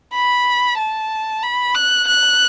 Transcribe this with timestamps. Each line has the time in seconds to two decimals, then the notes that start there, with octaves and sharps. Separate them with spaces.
0.14 B5
0.78 A5
1.43 B5
1.75 F#6
2.07 F#6